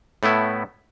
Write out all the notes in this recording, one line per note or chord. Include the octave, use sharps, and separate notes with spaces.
A2 A3 B3 E4